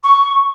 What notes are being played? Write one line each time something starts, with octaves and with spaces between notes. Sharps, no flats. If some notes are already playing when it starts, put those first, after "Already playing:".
C#6